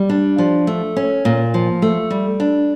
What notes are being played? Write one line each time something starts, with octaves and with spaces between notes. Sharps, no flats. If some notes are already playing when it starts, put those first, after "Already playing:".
Already playing: G3
D4
F3
A3
C#4
A#2
F3
A3
G3
D4